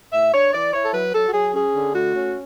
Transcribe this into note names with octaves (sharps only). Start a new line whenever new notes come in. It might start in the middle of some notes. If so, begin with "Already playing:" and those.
A2 E5
D4 C#5
E3 D5
E4 C#5
A4
F#3 B4
F#3 A4
F#4
F#3 G#4
C#4 G#4
D3
A3 F#4
C#4